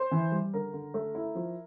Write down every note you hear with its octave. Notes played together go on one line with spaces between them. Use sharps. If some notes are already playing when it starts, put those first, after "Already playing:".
Already playing: C5
E3
G3
D3 A#4
D3
A3
E4
F3